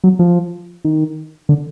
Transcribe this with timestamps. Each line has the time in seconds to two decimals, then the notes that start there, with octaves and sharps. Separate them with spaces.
0.04 F#3
0.19 F3
0.85 D#3
1.49 D3